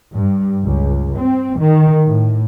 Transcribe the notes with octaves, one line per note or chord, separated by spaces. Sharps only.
G2
C#2
C4
D#3
A2